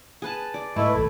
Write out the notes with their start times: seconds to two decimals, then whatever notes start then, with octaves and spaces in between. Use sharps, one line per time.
0.22 G#4 B4 A5
0.54 D5
0.76 G#2 A3 E4 B4 D#5 C#6
0.93 D#1 A#1 D#2 A4 B5